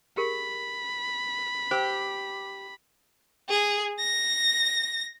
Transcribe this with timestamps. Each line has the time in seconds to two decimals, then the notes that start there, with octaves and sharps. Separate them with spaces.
0.17 G4 G#4 A#4 B5
1.71 G4 C5 F5 E6
3.49 G#4
4.00 A#6